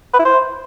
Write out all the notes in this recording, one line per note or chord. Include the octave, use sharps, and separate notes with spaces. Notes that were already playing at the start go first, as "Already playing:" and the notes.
B4
E4
C5